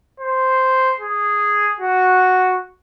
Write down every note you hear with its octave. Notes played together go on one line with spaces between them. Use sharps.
C5
G#4
F#4